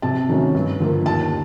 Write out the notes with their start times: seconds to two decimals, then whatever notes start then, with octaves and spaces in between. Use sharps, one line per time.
0.02 C3 A5
0.29 D#3 F#3 A3 C#4
0.55 G2
0.80 D3 F3 A#3
1.06 D#2 A5